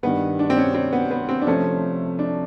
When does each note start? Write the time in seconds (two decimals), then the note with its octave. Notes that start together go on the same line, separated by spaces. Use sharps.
0.03 G2 D#3 G3 B3
0.39 D4
0.50 C4
0.57 C#4
0.74 C4
0.93 B3
1.11 B3
1.29 C4
1.42 D4
1.47 C3 F3 A3 C#4
2.19 D4